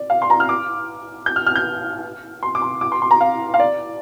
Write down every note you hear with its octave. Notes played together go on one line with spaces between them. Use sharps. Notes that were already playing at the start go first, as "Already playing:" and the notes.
Already playing: D5
F5
C6
A#5
F6
D6
G6
F6
F6
G6
C6
D6
C6
D6
C6
C6
A#5
F5
F5
D5